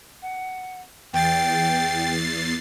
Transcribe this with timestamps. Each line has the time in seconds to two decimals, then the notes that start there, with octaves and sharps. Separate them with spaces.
0.22 F#5
1.13 E2 G5 A6 C7